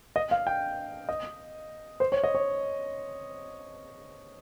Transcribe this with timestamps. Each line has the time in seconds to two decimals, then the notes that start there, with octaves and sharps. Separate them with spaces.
0.16 D#5
0.31 F5
0.47 G5
1.09 D#5
2.00 C5
2.12 C#5
2.24 D#5
2.35 C#5